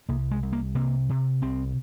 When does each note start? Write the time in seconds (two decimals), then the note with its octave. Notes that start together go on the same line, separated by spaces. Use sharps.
0.09 C2 A#3
0.31 G#3
0.43 C2
0.53 A#3
0.75 C3 A#3
1.09 C3
1.42 C2 C4